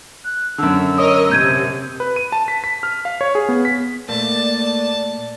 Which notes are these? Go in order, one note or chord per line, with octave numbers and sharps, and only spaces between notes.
F#6
F#2 D3 E6
A#4 C#5 D#5 D#6
C3 G6 G#6 D#7
B4
D#7
A5
B6
B6
F6
F5
C#5
G#4
B3
B6
A#2 A3 A#3 D5 A5